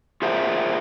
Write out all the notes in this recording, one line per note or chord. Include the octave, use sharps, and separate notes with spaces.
F4 G#4 A#4 C5 E5